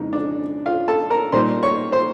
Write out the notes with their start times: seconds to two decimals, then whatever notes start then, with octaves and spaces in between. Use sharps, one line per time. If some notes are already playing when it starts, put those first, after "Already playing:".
Already playing: F2 C#3 E3 G#3 D#4
0.13 D4 D5
0.66 F4 F5
0.88 A4 A5
1.10 A#4 A#5
1.32 A#2 G3 A#3 D#4 C5 C6
1.63 C#5 C#6
1.92 C5 C6